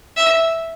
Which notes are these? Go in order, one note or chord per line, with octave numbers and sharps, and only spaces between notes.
E5